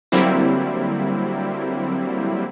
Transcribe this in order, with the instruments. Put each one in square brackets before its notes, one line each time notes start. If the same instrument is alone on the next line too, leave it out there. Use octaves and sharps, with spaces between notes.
[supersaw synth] D3 F#3 G3 A#3 C4 E4